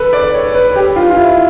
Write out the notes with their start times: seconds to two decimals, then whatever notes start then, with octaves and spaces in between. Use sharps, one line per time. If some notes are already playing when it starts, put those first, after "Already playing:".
Already playing: A4 B4
0.13 D5
0.34 C#5
0.54 B4
0.75 G4
0.96 F4
1.10 F4
1.17 E4